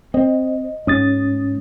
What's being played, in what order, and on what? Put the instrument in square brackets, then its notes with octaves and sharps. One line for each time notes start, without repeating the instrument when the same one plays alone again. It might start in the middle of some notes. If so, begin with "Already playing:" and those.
[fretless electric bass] C4 [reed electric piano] D#5
[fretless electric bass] G#2 [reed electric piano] C#4 D#6 A6